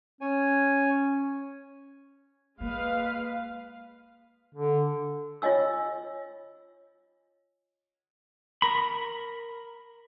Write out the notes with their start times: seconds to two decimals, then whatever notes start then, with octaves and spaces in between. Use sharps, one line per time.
0.21 C#4 C#5 G#5
2.61 G#3 A#3 B4 F5
4.55 D3
5.42 F4 C#5 D#5 G#5 E6
8.62 A#4 B5